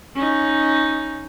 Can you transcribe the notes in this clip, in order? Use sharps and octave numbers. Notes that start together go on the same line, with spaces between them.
C#4 D#4